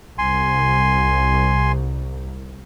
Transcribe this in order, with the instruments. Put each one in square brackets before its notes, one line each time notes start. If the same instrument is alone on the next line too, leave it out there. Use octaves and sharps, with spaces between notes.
[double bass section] C2 [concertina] G#5 C6